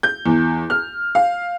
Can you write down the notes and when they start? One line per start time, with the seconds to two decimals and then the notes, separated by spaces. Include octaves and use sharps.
0.03 G6
0.26 E2
0.70 F6
1.15 F5